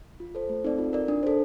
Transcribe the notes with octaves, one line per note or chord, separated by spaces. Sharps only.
F4
A4 C5
A3
C4 D#4 A4 D5
F4
A#4 D5
D4
A4 C5